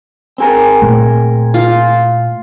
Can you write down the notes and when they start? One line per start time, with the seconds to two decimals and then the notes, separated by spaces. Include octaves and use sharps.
0.38 C4 G#4 A#4
0.82 A#2 A3
1.54 F4